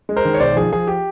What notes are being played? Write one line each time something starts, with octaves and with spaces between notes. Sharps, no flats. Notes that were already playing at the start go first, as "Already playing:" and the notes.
G#3
A#4 C5
D#3
C#5
B1 C5 D5
F3 G#4
F3 G#4
G4